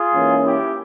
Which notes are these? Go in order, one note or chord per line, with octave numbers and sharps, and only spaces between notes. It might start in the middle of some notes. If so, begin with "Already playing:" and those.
Already playing: F4 G#4
G#2 E3 A#3 C#4
E4 G4